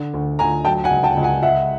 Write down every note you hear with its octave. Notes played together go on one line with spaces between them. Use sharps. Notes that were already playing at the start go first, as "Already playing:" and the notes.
Already playing: D3
D2
D2 G#5 A#5
F#3 G5 A5
F#5 G#5
C#2
G5 A5
C#2
F#5 G#5
G#3 E5 F#5